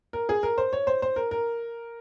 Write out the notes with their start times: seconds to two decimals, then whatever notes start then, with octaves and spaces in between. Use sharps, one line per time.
0.13 A#4
0.29 G#4
0.43 A#4
0.58 C5
0.73 C#5
0.87 C5
1.02 C5
1.16 A#4
1.31 A#4